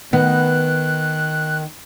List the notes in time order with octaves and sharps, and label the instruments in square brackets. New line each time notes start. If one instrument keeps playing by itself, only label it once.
[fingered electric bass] D#3 [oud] B3 [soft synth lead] F#6